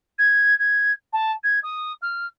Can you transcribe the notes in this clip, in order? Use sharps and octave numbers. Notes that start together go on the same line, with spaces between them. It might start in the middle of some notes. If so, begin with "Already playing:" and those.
G#6
G#6
A5
G#6
D#6
F6